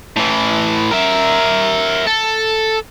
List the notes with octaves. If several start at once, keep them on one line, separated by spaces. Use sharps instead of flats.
A2 E3
A#4 E5
A4